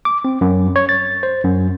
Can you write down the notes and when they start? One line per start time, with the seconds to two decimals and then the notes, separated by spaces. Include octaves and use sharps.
0.05 D6
0.25 C4
0.41 F#2
0.76 C#5
0.89 A6
1.23 C5
1.44 F#2